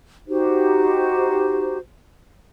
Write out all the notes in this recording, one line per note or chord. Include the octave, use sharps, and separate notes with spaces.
D#4 F#4 G4 C5